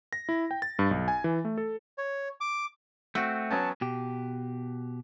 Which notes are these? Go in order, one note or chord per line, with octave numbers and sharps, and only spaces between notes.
A#6
E4
G5
A6
G2
B1
G#5
E3
A3
A4
C#5
D6
A3 C4 F#4
F#3 B3 C#4 A5
B2 G4